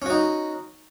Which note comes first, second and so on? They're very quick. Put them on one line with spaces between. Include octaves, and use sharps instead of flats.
C#4 F#4 D#4